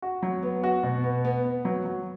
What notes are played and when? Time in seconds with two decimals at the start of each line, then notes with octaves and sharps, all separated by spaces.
0.02 F#4
0.23 F#3
0.43 B3
0.64 F#4
0.83 B2
1.04 B3
1.25 B3
1.45 B3
1.65 F#3
1.85 F#3